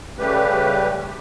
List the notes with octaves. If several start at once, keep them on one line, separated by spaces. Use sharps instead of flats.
C#3 G3 A3 G4 B4